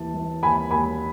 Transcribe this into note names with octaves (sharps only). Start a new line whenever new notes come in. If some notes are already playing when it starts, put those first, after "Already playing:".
Already playing: D#2 E3 A5
E3
D#2 G#5 B5
D#2 G#5 B5